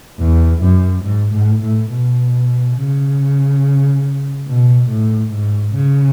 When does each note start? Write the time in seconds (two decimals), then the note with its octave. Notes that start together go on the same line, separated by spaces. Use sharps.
0.20 E2
0.63 F#2
1.05 G#2
1.34 A2
1.62 A2
1.91 B2
2.77 C#3
4.48 B2
4.89 A2
5.33 G#2
5.75 C#3